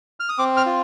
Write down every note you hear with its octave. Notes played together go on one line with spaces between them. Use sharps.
F6
D#6
C4 D6
F6
F4